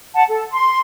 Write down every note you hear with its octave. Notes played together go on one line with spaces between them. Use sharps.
F#5 A5
A4
C6